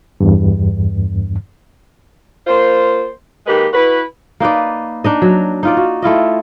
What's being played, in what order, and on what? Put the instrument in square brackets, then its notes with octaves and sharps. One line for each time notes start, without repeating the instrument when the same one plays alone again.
[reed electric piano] E2 G2
[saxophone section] A#3 F4 C5
D#3 G#3 A#3 G4 B4
E4 F#4 B4
[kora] A#3 D#4 B4 D5
D4 D#4 D#5
F#3
D#4 F4 D5
F#4
A3 E4 F4 D#5